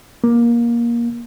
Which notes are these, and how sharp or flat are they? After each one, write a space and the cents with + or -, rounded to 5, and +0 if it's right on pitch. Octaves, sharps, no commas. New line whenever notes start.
A#3 +15